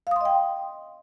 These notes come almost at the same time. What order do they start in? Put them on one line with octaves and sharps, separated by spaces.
F5 D#6 C6 D#5 G5